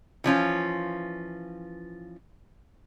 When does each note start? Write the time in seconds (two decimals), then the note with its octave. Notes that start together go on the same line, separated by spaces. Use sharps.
0.24 E3 F3 C#4 F4